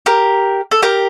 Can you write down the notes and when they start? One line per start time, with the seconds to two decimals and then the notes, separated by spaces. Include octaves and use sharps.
0.06 G4 A#4
0.71 A4
0.82 G4 A#4